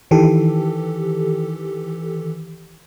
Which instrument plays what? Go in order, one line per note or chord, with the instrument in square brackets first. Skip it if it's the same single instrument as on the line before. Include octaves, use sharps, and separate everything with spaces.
[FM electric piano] D#3 E3 G4 A4